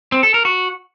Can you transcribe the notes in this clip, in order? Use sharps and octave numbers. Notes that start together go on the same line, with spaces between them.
C4
A4
A#4
F#4